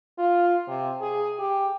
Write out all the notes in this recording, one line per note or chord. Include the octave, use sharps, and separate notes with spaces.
F4
C3
G#4
G4